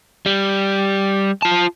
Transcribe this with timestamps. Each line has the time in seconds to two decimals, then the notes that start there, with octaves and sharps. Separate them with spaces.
0.26 G3
1.42 F4 A5